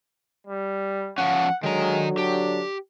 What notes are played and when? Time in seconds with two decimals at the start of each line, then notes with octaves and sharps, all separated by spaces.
0.47 G3
1.18 F3 C#4 F#5
1.63 D3 D#3 F#3 G#3 A#5
2.17 D4 G4